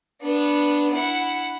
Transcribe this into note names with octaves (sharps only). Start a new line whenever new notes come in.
B3 D4
E4 F#5